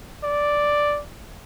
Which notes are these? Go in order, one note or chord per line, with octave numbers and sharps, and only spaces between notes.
D5